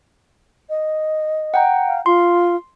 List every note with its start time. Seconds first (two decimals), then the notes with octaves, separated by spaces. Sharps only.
0.69 D#5
1.54 F#5 G5 A#5
1.87 F5
2.06 F4 C6